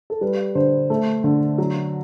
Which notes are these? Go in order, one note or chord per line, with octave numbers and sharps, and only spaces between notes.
A4
G3 B4
D3 C5
A3
D3
F#3